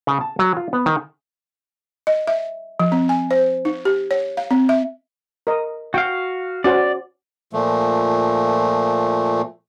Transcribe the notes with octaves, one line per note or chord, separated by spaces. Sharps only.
C#3
A5
F#3
F4
B3
D#3
D#5
E5
F3
C4
G#5
C5
D#4
G4
C#5
F5
C4
E5
A#4 D#5
F#4 F5 G5
C#4 F#4 C5 D5
A#2 F3 A3